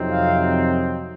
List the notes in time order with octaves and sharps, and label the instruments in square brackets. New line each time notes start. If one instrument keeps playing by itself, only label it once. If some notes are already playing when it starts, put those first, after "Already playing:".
Already playing: [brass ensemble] F2 C3 F#3 C4 D#4
F5